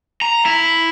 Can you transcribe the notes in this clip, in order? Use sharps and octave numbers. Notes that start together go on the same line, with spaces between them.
A#5
E4